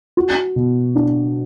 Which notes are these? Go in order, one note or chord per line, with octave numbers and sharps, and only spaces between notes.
F#4
B2
D4